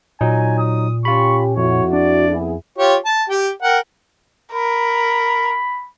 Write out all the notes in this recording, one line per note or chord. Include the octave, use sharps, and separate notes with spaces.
A#2 F#3 D#4 G#5
D#6
C#4 F4 G4 B5 C#6
F2 E4 F#4 C#5
D4 D5
B3 E4 G#4
F4 G4 C#5
A5
G4 G5
A#4 F#5 G5
A#4 B5